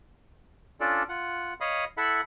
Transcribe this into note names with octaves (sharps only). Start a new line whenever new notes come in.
C#4 D4 F4 A4 D5
F4 F#5
C#5 D#5 F5 B5 D#6
E4 A4 E5 F#5 B5